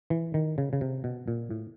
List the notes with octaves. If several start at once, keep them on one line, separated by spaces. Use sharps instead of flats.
E3
D#3
C#3
C#3
C3
B2
A#2
A2